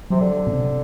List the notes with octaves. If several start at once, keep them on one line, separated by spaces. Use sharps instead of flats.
C3 F#3
D3
B2
C3